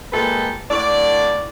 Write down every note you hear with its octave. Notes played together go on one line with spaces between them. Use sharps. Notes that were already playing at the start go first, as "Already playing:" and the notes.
A#2 G#3 A4 B4 G5
A2 D3 D5